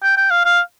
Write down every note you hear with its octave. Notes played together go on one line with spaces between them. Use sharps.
G5
G5
F5
F5